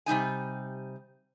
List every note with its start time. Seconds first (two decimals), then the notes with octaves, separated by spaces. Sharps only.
0.06 C3 G3 D#4 G#5